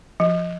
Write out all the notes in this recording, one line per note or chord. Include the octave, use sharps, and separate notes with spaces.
F3